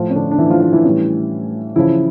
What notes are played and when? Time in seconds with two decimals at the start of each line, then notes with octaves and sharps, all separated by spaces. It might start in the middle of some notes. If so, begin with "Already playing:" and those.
Already playing: A2 F3 F4
0.10 C#4
0.16 D3 D4
0.31 D4
0.38 E3 E4
0.50 F3 F4
0.61 F3 F4
0.72 E3 E4
0.84 A2 E3 G3 C#4
1.76 C#3 E3 F3 E4